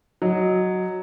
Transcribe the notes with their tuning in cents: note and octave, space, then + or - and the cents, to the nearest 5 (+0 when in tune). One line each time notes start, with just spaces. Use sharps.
F#3 +0 D#5 +0